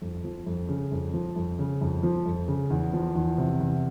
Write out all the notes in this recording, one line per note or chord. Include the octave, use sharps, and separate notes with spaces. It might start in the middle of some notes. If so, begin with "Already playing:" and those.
F2
F3
F2
C#3
F2
F3
F2
C#3
F2
F3
F2
C#3
E2
F3
E2
C3
E2